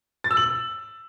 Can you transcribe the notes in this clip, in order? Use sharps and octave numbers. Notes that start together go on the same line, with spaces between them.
A6
E6
F#7